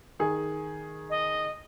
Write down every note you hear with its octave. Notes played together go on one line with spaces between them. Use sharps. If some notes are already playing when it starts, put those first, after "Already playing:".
D#3 G#4
D#5